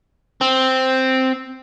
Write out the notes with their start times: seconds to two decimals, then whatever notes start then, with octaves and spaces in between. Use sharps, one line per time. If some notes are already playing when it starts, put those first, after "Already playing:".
0.41 C4